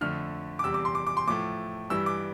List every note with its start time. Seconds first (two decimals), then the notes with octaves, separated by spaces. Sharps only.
0.01 F2 D3 A3 F6
0.59 D6
0.64 E2 C3 G3 E6
0.74 D6
0.85 C6
0.95 D6
1.07 D6
1.17 C6
1.28 A2 F3 A3 D6
1.90 G2 E3 G3 E6
2.06 D6